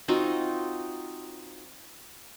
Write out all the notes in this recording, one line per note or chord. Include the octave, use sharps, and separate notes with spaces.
C4 D#4 F4 F#4